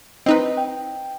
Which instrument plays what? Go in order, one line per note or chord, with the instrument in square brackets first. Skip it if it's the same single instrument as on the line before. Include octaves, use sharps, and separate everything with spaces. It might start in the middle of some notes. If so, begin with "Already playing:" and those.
[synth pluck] C4 D#4 B4 [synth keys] D#5
[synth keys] G5